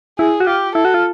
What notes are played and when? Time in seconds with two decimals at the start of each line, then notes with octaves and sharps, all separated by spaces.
0.19 E4 G#4
0.40 F#4
0.47 F4 G4
0.75 E4 A4
0.85 F#4
0.94 F4